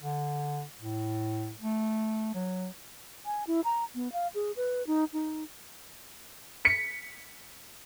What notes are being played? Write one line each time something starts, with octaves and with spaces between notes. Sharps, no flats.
D3
A2
A3
F#3
G#5
E4
A#5
B3
F5
G#4
B4
D#4
D#4
B6 C#7